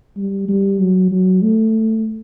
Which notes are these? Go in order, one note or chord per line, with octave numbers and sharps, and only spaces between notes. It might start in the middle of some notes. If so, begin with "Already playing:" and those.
G3
G3
F#3
F#3
A3